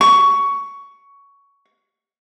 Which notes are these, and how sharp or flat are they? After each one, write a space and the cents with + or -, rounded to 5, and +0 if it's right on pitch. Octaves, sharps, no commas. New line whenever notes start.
C#6 +15